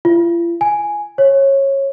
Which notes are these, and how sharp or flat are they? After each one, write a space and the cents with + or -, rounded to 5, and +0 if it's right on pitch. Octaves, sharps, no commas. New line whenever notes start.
F4 -45
G#5 +0
C#5 -20